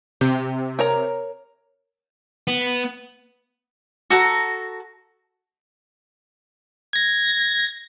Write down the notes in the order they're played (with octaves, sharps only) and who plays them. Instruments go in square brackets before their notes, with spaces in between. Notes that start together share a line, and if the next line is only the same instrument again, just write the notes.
[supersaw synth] C3 [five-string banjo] G4
[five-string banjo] A#4 C#5 A#5
[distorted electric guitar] B3
[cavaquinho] F#4 A4 A#5
[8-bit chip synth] G#6 A#6